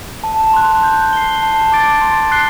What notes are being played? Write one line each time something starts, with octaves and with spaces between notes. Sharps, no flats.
A5
C6 F#6
G6
C7 G7
A5
D6 A6 D7
C6
F#6 C7 G7